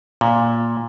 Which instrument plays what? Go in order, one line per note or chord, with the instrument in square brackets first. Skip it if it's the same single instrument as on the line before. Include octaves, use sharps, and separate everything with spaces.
[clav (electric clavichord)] A#2